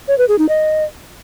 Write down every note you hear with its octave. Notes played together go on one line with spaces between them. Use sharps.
C#5
B4
G#4
D#4
D#5